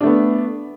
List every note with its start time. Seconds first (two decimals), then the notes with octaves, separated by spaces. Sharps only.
0.01 D4
0.03 A3
0.06 B3